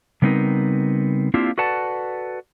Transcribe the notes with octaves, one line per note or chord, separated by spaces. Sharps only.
C#3 G3 B3 C4 D#4 A#4
A#3 C4 D4 E4 F4 G4
F#4 A4 B4 D5 F#5 A5